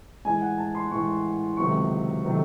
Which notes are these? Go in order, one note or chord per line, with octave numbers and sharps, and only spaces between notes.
A2 E3 G#3 G#5
F#5
A5
C6
A2 E3 G#3 C#6
C#2 C3 D#3 F#3 A3 C#6
C3 D#3 F#3 A3